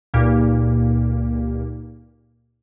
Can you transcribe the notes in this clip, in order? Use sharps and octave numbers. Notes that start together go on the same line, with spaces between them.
C#2 A#2 A#3 D#4 G4